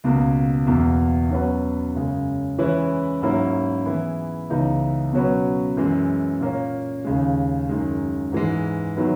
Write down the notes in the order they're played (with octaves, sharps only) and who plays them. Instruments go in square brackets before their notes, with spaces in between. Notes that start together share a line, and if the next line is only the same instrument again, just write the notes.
[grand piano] C#2 B2 A#3
E2 B2 A#3
B2 F#3 C#4 F#4 B4
F#2 C#3 G#3
E3 G#3 C#4 E4 B4
G#2 F#3 A#3 C#4 E4
E3 B3 E4 G#4 B4
C#2 C#3 E3 B3 D#4
B2 F#3 C#4 F#4 B4
F#2 E3 G#3
A#2 A#3 C#4
D#2 C#3 G#3
F#2 D#3 G#3
G#2 E3 G#3
D#3 F#3 B3 E4